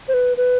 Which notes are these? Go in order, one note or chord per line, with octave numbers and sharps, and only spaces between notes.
C5
B4
B4